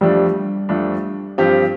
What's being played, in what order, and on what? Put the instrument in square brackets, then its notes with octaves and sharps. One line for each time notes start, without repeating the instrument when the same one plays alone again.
[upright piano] F2 F3 A3 D4 [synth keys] G3
[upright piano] F2 F3 A3 D4
G2 F3 C4 G4